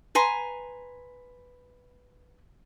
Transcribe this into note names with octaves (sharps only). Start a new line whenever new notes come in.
B4 G#5 A#5 C6